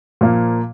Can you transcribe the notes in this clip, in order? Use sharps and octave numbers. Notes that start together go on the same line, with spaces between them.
A#2 F3 A#3